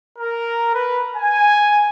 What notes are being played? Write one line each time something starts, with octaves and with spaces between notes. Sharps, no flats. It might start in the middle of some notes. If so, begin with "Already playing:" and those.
A#4
B4
G#5